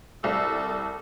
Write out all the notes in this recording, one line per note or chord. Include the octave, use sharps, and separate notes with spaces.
C2 A4